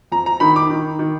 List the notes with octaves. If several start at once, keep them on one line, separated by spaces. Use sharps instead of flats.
F2 A#5
A#5
D#3 B5
D6
D#3
D#3